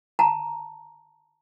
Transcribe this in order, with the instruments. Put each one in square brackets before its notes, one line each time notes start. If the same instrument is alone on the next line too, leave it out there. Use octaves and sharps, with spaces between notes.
[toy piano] A5 A#5